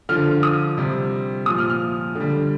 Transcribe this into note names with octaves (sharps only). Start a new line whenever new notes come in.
D3 F3 F6
D#6
C3 G3
A#2 F3 D#6
F6
F6
D3
G3